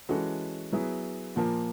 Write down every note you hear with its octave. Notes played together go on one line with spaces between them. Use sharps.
E3 G#3 C#4 F#4 A4
F#3 B3 E4 G#4
A#2 F3 A#3